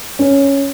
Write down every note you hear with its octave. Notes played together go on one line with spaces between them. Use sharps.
C#4